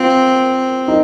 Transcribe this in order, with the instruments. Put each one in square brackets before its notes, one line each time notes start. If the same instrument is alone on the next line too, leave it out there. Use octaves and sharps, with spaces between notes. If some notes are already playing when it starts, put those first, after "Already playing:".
Already playing: [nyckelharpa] C4 [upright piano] F4
[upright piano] D#4